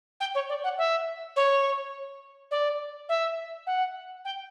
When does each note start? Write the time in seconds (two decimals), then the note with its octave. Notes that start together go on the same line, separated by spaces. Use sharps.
0.20 G5
0.34 C#5
0.49 D5
0.63 F#5
0.78 E5
1.36 C#5
2.51 D5
3.09 E5
3.66 F#5
4.25 G5